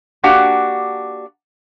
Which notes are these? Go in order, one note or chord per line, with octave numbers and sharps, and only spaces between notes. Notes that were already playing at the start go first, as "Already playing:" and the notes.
A#3 D4 F#4 G4 F#5